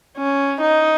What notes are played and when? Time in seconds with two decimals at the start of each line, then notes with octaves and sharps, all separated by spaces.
0.17 C#4
0.61 D#4